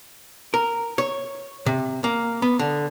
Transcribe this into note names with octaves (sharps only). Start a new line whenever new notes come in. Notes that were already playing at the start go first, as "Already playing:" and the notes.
A#4
C#5
C3
A#3
B3
D3